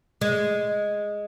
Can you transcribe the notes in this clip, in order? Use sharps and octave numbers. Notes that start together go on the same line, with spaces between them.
G#3